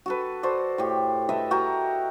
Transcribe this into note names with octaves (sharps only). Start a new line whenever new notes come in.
F#4 A4 B4
F#4 A4 C5 D5
A2 G4
A4 B4 D#5 E5
F#4 A#4 G5 A#5